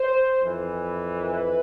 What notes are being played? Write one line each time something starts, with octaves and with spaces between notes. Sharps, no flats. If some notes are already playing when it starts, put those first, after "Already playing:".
Already playing: C5
F2 E3
B4